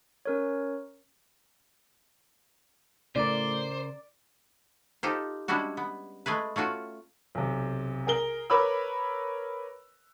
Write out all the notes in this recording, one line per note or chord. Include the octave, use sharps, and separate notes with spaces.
C#4 A#4 C#5
A2 C#3 A#4 C5 D5
D#4 F4 G4 A4 C5
G3 G#3 C#4 D4 E4 F#4
B3
G#3 A3 G#4 B4
A3 C#4 F4 F#4
B1 C3
G#4 A#4 G7
A#4 B4 C#5 B5 D6 E6